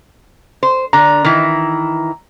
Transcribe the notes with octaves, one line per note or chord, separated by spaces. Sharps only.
C5
D3 A#5
D#3 E3 E4